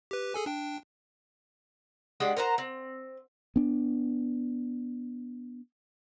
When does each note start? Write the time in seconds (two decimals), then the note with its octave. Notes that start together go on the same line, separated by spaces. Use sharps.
0.11 G4 B4
0.34 G#4 A4 G#5
0.46 D4 G5
2.20 G#3 D4 G4 F#5
2.37 A#4 C5 F#5 A#5
2.58 C4
3.56 B3 D4